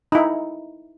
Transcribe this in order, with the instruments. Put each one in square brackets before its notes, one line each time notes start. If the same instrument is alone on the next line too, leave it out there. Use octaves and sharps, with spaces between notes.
[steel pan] D#4 E4